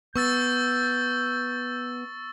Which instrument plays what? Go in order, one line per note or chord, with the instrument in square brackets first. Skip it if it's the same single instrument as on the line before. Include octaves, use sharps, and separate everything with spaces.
[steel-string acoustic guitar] B3 [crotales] C#6 E6 A6 [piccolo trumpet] G6